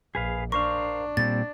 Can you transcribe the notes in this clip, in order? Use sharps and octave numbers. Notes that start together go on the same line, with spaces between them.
A#1 G#4 B4 F5
D4 A#4 C5 F5 C#6
A#2 G3 C4 A6